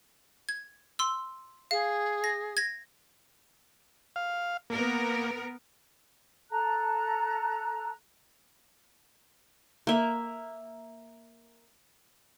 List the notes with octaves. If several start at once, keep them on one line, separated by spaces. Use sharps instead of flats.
G#6
C6 E6
G#4 F5
A#6
G#6 A#6
F5
A#3 B3 A#4
A4 A5 A#5 F#6
A#3 E5